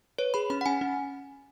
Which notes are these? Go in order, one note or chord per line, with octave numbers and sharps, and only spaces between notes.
B4 C#5
G#4 B5
C#4 B5
F#5
C#4 G#5
C#4